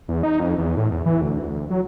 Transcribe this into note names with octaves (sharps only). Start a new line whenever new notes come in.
E2
D#4
F2
E2
A2
E2
E3
D2
D2
F#3